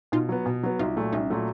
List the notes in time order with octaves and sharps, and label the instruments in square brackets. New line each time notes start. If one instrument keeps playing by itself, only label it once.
[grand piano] B2 [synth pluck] D#4 F4
[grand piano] F#3 B3
B2
F#3 B3
[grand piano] C2 [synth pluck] D#4 F4
[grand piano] A#2 F#3 A3
[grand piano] C2 [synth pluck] C#4 D#4
[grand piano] A#2 F#3 A3